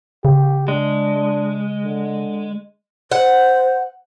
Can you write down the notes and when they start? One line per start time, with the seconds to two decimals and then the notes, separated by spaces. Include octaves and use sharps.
0.25 C#3 G4
0.68 G#3 D4
1.84 D3
3.11 C5 F#5